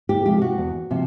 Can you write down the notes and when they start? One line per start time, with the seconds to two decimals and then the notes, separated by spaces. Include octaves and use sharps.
0.09 G4
0.25 C3 F3 G#3 G4
0.42 F#4
0.58 E2
0.91 C3 F3